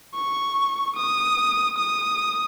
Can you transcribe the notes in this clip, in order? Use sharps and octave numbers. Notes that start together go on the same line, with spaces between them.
C#6
D#6
D#6